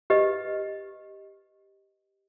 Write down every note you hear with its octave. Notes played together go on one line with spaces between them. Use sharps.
G4 B4 D#5